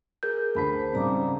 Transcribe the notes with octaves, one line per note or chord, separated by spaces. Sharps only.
G#4 A#4 G6
D2 C5 A5 B5 B6
G#2 C#3 G3 C4 D5 A#5 D6